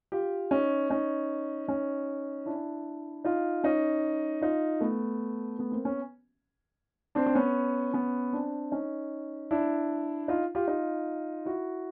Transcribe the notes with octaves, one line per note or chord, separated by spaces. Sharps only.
F4 G4
C#4 D#4
C#4 D#4
C#4 D#4
D4 E4
D#4 F4
C#4 D#4
D#4 F4
A3 B3
A3 B3
A#3 C4
B3 C#4
C4 D4
C4
B3 C#4
B3 C#4
C4 D4
C#4 D#4
D4 E4
D#4 F4
F4 G4
D#4 F4
E4 F#4